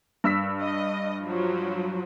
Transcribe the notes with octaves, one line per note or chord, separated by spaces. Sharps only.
G2 E6 B6
D#5
F3 F#3